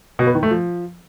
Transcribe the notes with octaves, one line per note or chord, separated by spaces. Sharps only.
B2
B3
D#3
A3
F3